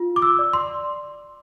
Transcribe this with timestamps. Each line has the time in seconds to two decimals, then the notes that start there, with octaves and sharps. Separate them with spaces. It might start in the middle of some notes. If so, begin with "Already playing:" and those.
Already playing: F4
0.16 D6
0.22 E6
0.39 D5
0.53 C6